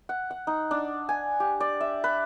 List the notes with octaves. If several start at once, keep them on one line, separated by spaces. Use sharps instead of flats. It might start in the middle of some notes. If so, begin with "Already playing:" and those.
F#5
F#5
D#4
D4
G#5
G4
D5
E5
B4